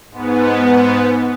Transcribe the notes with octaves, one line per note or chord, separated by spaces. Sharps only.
G#2 B3